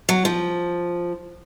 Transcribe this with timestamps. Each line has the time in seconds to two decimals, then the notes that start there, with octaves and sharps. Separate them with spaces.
0.09 F#3
0.25 F3